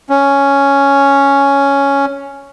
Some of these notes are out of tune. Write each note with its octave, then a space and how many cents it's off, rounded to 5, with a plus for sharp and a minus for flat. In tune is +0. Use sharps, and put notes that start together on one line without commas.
C#4 +5